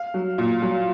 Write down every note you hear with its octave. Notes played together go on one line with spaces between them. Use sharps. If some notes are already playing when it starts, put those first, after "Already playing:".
Already playing: F5
F#3
A#2
F#3